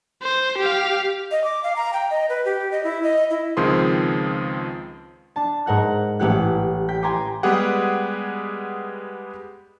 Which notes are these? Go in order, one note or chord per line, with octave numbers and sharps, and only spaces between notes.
C5
G4 F5
D#5
D6
F5
A#5
G5
D#5
B4
G4
D#5
E4
D#5
E4
C#2 D#3 F3 C4 G#4 C6
D4 A5
G#2 A#4 F#5 F#6
A1 A3 C#4 G4 F#5 F#6
G5 G6 B6
G5 G#5 A#5 C6 D6
G3 G#3 B3 G4 G#4 F#5